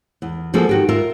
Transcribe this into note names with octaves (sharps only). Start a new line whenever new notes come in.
E2
F3 A#3 F#4 G#4 A4
D#3 F#4 G4
F4 A#4 E5